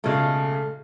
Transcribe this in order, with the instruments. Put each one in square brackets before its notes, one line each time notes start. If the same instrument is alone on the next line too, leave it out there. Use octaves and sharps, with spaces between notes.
[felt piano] B1 A#2 C#3 [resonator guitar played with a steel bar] G#3 A3